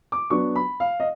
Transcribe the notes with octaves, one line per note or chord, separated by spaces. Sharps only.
D6
F#3 B3 D4 C#6
B5
F5
D#5